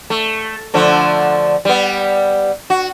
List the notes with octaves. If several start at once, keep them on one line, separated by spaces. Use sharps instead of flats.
A3
D3 F3 A3
G3 B3
F#4